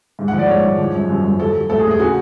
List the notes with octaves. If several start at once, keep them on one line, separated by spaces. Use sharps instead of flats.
G#2
F#5
F3
D5
G#2 C#5
G#2
F3
F#2
F#2
F#2
F#3 A4
F#3
A2 A4
G#4
A2
G#4
C#3 F#4